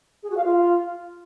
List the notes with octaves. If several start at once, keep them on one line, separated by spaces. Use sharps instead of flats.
G#4
F#4
F5
F4